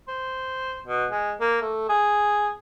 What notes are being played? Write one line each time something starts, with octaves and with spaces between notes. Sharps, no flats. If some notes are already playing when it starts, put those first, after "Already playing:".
C5
B2
G#3
A#3
A3
G#4